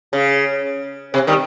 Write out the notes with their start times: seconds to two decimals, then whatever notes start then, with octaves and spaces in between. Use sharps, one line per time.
0.13 C#3
1.14 C3
1.27 D#3 G3